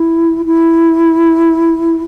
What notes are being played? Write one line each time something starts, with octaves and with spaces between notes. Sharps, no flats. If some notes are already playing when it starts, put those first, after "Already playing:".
Already playing: E4
E4